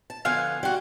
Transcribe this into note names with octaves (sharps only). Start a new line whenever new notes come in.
A5
D3 F3 B3 F5 G#5
G3 F#4